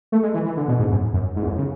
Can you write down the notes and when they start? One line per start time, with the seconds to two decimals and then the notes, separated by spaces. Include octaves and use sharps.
0.12 A3
0.23 G#3
0.34 E3
0.45 E3
0.57 D3
0.68 B2
0.79 G#2
0.91 F#2
1.14 F#2
1.36 G#2
1.42 E2
1.47 F#2
1.58 C#3